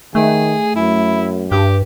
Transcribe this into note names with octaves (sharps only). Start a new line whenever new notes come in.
D#3 A3 G#4
F#2 E4
G2 G4